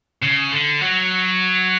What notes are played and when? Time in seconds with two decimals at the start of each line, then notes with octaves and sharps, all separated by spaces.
0.23 C#3
0.52 D3
0.81 F#3